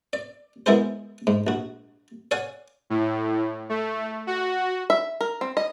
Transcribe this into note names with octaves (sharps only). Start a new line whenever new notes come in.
D5
G#3 B3 E4 G#4 A#4 C5
G#2
A#1 F#4
C#5 D5 F5 F#5 G#5
A2
A3
F#4
E5
A#4
C4
D#5